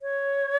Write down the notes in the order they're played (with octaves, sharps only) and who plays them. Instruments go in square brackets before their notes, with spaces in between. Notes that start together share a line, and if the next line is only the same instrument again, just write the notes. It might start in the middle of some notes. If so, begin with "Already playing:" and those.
[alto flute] C#5